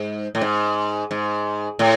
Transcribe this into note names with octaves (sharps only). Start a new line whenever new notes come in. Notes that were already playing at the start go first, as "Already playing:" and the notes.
Already playing: G#2
A2
G#2
G#2
A2